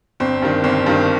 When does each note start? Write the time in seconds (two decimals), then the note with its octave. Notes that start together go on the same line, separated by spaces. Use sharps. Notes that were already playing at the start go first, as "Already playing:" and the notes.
0.20 G1 C4
0.42 G2 D#3
0.64 G1 C4
0.86 G2 D#3